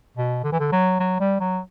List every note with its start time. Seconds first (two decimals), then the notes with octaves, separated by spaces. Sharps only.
0.17 B2
0.44 D3
0.52 E3
0.60 D3
0.72 F#3
0.99 F#3
1.20 G3
1.40 F#3